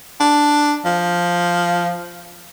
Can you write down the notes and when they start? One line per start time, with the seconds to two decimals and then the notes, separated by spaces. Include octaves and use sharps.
0.20 D4
0.85 F3